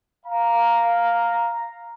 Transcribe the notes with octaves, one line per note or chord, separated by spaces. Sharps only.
F5 A#5